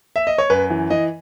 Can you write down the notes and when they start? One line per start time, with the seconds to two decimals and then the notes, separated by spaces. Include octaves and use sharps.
0.16 E5
0.27 D#5
0.38 C#5
0.50 F#2 B4
0.70 E3
0.90 E3 D#5